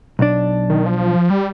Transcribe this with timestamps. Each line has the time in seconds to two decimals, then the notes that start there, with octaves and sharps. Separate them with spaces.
0.19 B1 D4
0.70 D#3
0.86 F3
1.30 G3